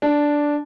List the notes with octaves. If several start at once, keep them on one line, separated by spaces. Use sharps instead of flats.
D4